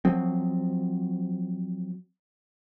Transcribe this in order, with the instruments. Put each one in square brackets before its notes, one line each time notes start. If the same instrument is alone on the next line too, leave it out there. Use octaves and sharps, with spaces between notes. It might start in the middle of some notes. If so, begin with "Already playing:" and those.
[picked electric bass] F3 F#3 C4